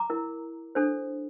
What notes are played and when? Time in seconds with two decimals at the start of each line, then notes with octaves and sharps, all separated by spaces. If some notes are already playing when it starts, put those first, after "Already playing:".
Already playing: A#5 D6
0.10 E4 A#4
0.75 D4 A4 C5